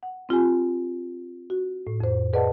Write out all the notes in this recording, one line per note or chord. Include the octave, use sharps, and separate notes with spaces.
F#5
C4 F4 G4 G#5
F#4
A2
F2 C5
G#4 B4 D5 D#5 F#5 A5